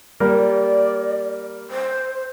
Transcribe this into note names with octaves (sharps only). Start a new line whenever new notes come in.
G3 A#3 A#4 D5
C5